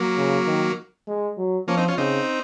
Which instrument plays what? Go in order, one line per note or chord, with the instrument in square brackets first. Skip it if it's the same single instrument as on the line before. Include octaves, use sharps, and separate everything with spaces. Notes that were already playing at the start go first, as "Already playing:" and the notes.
Already playing: [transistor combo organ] F#3 A#3
[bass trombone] C#3
D#3
G#3
F#3
[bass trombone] F3 [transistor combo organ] A#3 C#4
[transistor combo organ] C4 D#4
C#4 F4
[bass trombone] C#3 [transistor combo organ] C4 D#4